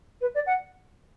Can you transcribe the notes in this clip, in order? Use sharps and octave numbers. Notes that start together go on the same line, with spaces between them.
B4
D5
F#5